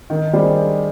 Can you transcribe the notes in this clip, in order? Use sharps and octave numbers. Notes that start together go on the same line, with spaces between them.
D#3
G3 D4 G#4 C5